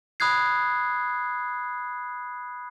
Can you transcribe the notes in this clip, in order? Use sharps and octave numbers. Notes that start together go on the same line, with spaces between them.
B5 D#6 F#6 G#6 C7